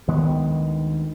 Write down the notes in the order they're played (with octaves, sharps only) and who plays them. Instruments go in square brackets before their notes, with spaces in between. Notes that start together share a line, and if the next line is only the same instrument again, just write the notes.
[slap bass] D2 D#3 G#3 B3